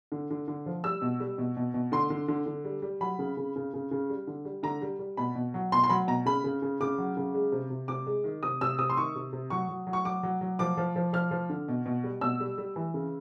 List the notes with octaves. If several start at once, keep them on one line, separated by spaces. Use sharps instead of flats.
D3
D3
D3
F3
G3 E6
B2
G3
B2
B2
B2
D3 C6
D3
D3
D3
G3
G3
F#3 B5
C#3
C#3
C#3
C#3
C#3
G3
D3
G3
D3 A#5
G3
G3
B2 B5
B2
F#3
B2 C6
C6
F#3 B5
B2 A#5
C#3 B5
C#3
C#3
C#3 D6
F#3
C#3
G#3
C3
C3
C3 D6
G#3
D#3
C3 D#6
C3 E6
C3 D#6
C6
D#3 C#6
C3
C3
F#3 C#6
F#3
F#3
C#6
F#3 D6
F#3
F#3
F3 D6
F3
F3
F3 F6
F3
D3
B2
B2
G3
B2 E6
G3
G3
E3
C#3